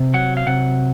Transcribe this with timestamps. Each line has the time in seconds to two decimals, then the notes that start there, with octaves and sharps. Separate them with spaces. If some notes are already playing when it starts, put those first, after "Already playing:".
Already playing: C3
0.14 F#3 F#5
0.37 F5
0.47 C3 F#5